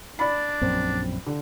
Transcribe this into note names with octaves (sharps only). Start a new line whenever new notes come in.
D4 D5 B5
A#1 F#2 C4
D3